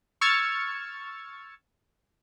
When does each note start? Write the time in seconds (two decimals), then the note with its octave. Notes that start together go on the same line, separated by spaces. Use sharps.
0.21 C#6 E6 F6 G#6 A6 C#7